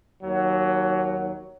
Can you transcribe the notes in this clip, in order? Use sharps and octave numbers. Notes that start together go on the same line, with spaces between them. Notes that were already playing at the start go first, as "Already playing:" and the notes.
D#2 F#3